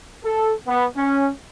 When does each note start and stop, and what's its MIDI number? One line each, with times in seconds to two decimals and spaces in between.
0.24 0.52 69
0.66 0.85 59
0.96 1.30 61